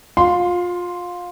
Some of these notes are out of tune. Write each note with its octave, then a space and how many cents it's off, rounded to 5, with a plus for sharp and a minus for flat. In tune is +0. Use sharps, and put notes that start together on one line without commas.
F4 +25 C6 +0